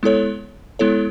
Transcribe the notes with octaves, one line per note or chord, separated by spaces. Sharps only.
G#3 B3 E4 A4 C#5
G#3 B3 E4 A4 C#5